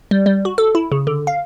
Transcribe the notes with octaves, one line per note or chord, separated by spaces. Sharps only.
G3
G3
F#4
A4
E4
C#3
D3
F5